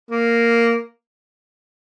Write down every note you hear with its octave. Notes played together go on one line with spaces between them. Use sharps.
A#3